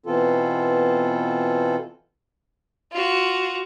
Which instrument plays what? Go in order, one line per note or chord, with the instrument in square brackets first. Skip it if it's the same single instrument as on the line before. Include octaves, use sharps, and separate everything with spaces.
[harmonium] B2 E3 B3 C4 F4 A4
[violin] F4 F#4